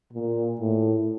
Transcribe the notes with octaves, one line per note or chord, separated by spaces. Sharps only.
A#2
A2